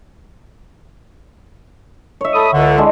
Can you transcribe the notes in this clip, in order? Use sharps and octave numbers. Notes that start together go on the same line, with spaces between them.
C#5 E5
A4 B5 D#6
C#2 D3
G#3 D4 E4